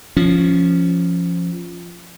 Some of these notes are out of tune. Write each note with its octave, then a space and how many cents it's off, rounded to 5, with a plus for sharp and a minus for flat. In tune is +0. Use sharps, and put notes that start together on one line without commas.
F3 -10 C#4 +0